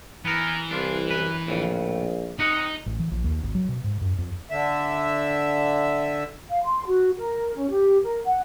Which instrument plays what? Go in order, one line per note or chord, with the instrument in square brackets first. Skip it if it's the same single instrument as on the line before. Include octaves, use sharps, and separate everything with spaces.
[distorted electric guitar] E3 [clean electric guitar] B3 A#4
[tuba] C2 [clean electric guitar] D4 F4
[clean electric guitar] F#2 B4
[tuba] A#1 [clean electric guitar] F2 A2 C#3
[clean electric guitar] C3 D#5 F#5 [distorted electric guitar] D#4
[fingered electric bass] A1
E3
A#1
D#2
G#1
F#3
B2
G#2
F#2
F2
[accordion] D3 E5
[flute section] F5
C6
F#4
A#4
C#4
G4
A#4
F#5